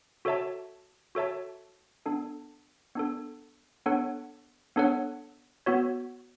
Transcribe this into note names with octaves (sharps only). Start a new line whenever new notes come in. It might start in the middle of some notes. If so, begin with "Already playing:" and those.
F#4 A4 C#5 E5 A5
F#4 A4 C#5 E5 A5
B3 D4 A4
B3 D4 A4
B3 D4 A4 C#5 F#5
B3 D4 A4 C#5 F#5
B3 F#4 C#5